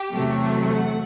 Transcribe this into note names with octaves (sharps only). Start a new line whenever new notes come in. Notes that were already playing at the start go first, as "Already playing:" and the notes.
Already playing: G4
E2 C3 F#3 A3
F#5